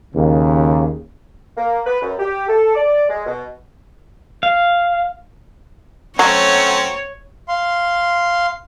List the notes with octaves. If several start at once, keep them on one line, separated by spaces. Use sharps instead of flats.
D#2 C#3
A#3
B4
F#2
G4
A4
D5
G#3
B2
F5
F#3 A3 C4 C#4 C#5
F5 C6